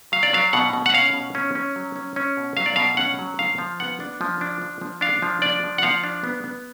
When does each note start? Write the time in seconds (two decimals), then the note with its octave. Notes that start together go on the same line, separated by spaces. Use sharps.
0.12 F#3 F5
0.23 D5
0.33 F#3 F5
0.53 B2 F#5
0.73 B2
0.86 F#5
0.93 C#4 F5
1.14 B2
1.35 C#4
1.55 C#4
1.76 F#3
1.96 C#4
2.16 C#4
2.37 B2
2.57 F#3 F5
2.66 D5
2.76 B2 F5
2.97 C#4 F#5
3.19 F#3
3.39 F3 F5
3.58 F3
3.80 B3 F#5
4.00 D4
4.21 F3
4.41 D4
4.62 F3
4.81 F3
5.01 D4 F5
5.22 F3
5.42 D4 D5
5.64 F3
5.78 F#5
5.83 F3 F5
6.04 D4
6.24 B3
6.44 B3